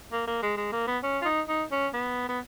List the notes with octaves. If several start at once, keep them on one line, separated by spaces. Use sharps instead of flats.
A#3
A#3
G#3
G#3
A#3
B3
C#4
F4
D#4
D#4
C#4
B3
B3